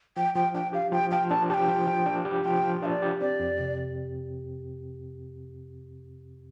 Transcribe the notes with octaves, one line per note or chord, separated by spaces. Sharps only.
F3 G5
F3 G5
D4 G5
G4 F5
F3 G5
F3 G5
D4 A5
G4 G5 A5
F3
F3
D4
G4
F3 G5
F3
D4 D5 F5
G4
C4 D5
F2
C3